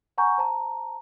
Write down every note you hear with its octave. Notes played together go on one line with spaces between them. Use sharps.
F#5 G#5 A#5 C#6 G6
C5 A5 A#5